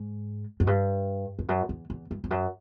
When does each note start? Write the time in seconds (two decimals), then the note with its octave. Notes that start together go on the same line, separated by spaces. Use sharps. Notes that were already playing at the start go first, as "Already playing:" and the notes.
Already playing: G#2
0.60 F#2
0.67 G2
1.39 F2
1.49 F#2
1.69 E2
1.90 E2
2.11 G2
2.24 F2
2.31 F#2